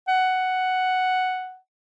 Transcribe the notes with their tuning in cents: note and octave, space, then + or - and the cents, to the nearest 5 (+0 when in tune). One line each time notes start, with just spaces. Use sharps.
F#5 +5